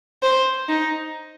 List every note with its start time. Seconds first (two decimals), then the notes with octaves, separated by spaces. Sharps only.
0.23 C5
0.69 D#4